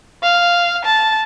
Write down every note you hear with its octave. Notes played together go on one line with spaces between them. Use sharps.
F5
A5